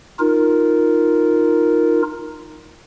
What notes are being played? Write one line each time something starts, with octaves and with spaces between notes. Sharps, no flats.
D#4 F4 A#4